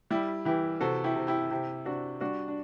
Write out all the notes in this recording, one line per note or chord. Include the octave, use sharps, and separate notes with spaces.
G3 E4 G4
E3 E4 G4
C3 F#4 A4
E4 G4
C3
E4 G4
C3 E4 G4
C3 D4 F#4
G3 D4 F#4
D4